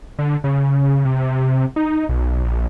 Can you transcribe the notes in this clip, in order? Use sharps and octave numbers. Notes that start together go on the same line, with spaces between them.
D3
C#3
C3
D#4
B1
A#1